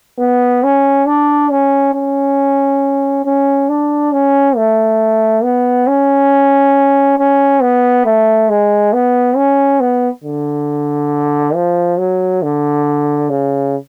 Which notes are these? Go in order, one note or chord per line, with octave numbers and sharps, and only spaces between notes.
B3
C#4
D4
C#4
C#4
C#4
D4
C#4
A3
B3
C#4
C#4
B3
A3
G#3
B3
C#4
B3
D3
F3
F#3
D3
C#3